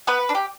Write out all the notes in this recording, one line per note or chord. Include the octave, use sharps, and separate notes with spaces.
B3 B4
D4
G4